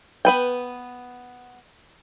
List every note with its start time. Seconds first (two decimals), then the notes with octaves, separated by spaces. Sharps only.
0.25 B3 B4 G5